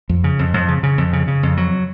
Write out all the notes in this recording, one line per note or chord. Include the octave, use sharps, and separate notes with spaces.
F2
C#3
F2
F2
C#3
C#3
F2
C#3
C#3
F2
F#3